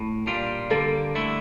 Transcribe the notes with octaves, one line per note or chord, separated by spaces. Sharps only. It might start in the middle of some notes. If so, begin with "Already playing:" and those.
Already playing: A2
A#2 G3 D4 F4
D3 G3 A#3 A4
D3 A3 E4